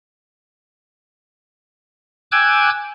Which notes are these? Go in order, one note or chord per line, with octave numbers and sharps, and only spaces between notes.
G5 G#5 D6 E6 F#6 G#6